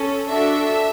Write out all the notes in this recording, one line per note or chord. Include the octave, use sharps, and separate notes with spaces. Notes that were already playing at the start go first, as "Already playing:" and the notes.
Already playing: C#4 A4
D4 F#4 A4 E5